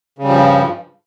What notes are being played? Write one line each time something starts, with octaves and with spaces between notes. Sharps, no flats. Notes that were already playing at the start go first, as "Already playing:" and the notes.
G2 C#3 F3 G3